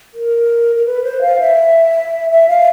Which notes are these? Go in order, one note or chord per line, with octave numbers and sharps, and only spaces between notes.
A#4
A#4
B4
C5
F5
E5
E5
F5